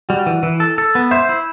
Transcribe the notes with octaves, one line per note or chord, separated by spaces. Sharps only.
G3 F#4
E3
E3
A4
A4
B3
C5 E5
E4